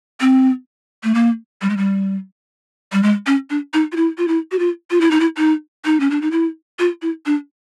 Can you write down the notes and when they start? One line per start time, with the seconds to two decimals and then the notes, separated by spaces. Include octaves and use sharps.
0.21 C4
1.04 A3
1.15 A#3
1.62 G3
1.70 G#3
1.77 G3
2.93 G3
3.03 G#3
3.27 C#4
3.50 D4
3.74 D#4
3.92 F4
3.96 E4
4.18 F4
4.28 E4
4.52 F#4
4.59 F4
4.91 F4
5.01 E4
5.11 D#4
5.20 E4
5.38 D#4
5.85 D#4
6.00 C#4
6.11 D4
6.22 D#4
6.31 E4
6.79 F4
7.02 E4
7.26 D4